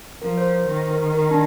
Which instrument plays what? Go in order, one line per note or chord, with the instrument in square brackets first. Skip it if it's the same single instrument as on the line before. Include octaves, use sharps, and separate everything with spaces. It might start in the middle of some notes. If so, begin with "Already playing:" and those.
[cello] F3 [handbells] A#4
[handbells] C5
A#4
[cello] D#3 [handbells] C5
[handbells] A#4
A#4
D4